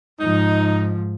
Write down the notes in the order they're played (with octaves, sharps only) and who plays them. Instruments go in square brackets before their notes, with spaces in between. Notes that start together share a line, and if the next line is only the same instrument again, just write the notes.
[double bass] G#2 F3 [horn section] D#4